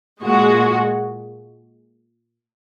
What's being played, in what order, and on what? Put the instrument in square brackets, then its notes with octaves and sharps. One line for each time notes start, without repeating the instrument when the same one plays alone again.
[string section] A#2 G#3 F#4